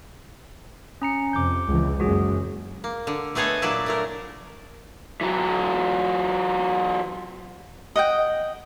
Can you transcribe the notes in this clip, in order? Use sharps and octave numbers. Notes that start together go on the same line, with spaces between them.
C#4 A#5 C#7
F2 C3 D6 G6
C#2 E3
F#1 F#2 G#3 F#4 G#4
A#3
D3
A3 B3 G#4 A4 C#5 D#5
A#2 F#3 D4 E4 D5 A5
A#2 A3 A#4
E3 F#3
D#5 F#5 G5